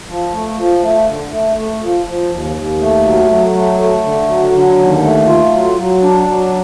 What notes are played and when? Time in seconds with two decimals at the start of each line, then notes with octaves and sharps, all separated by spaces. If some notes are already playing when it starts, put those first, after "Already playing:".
0.09 F3
0.33 A3
0.58 F3
0.83 A3
1.07 D3
1.32 A3
1.57 A3
1.82 F3
2.06 F3
2.30 D#2
2.56 D#2
2.81 A3
3.05 F#3
3.30 F#3
3.55 A3
3.80 A3
4.04 D3
4.28 F#3
4.53 D3
4.78 D#2
5.03 A3
5.27 F4
5.52 F#3
5.78 F#3
6.03 D4
6.27 F#3